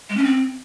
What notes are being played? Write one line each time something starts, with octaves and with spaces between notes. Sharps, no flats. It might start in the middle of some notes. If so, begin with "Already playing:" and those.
G#3
C#4
C4